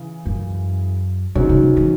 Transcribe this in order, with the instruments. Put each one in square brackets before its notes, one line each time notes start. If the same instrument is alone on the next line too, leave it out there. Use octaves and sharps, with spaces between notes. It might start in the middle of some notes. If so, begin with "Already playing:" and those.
Already playing: [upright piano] C#3 E3
[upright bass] F#2
[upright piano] G#2 F#3 C#4 [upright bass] B2
[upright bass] C#3
C#3
E3